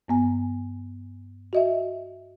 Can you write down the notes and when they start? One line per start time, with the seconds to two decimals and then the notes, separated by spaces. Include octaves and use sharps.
0.08 G2 B3 G#5
1.53 F#4 D#5 E5